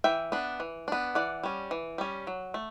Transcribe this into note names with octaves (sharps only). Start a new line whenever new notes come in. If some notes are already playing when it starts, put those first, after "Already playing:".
E3 E5 G5
B3 D4
E3
B3 D4
E3 D5 F#5
G3 C#4
E3
G3 C#4
F#3
A3